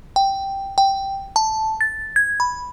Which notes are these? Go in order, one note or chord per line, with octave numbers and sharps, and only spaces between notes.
G5
G5
A5
A6
G#6
B5